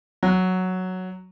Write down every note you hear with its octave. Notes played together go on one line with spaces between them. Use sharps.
F#3